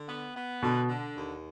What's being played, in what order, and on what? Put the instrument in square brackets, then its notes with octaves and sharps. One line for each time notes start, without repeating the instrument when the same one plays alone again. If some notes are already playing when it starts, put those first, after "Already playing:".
Already playing: [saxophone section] D3
B3
B3
[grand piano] B2 [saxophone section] D3
[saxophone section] D3
D#2